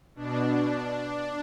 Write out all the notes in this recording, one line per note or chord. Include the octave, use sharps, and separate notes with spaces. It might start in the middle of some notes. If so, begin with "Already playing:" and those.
B2 D4